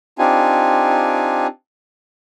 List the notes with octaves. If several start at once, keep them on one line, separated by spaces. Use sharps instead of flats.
C4 D4 D#4 F4 G4 G#5